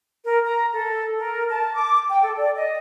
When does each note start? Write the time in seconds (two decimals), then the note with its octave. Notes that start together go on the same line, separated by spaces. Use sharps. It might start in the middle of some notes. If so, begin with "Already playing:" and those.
0.24 A#4
0.45 A#5
0.72 A4
1.19 A#4
1.49 A5
1.74 D6
2.08 G5
2.23 A4
2.36 D5
2.55 D#5